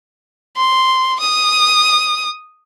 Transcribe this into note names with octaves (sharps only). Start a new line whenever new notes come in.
C6
D#6